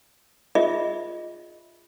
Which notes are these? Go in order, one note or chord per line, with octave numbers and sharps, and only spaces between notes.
F4 G#4 D#5 E5